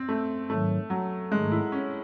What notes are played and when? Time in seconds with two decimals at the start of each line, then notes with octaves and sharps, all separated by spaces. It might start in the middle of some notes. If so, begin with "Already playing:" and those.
Already playing: C4
0.09 A3
0.49 G#2 D#3 F#3 A3
0.90 F#3
1.32 G#2 D#3 G#3 A3
1.51 E4
1.72 C#4